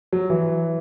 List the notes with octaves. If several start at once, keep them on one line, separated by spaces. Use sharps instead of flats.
F#3
E3